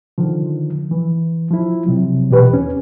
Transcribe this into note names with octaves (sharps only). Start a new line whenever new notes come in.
D3 D#3 F3
E3
F3 E4
C3 F#3
B2 E3 G4 B4
D#2 C#4